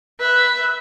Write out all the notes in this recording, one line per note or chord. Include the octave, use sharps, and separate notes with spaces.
B4 E5